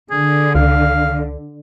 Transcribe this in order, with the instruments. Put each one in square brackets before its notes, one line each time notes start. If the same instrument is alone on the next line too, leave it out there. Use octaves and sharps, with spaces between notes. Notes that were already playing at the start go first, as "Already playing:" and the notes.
[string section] D3 [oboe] G#4
[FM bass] C#2 [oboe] F5